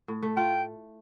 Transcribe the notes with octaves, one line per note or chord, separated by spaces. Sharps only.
A2
A3
F4 G5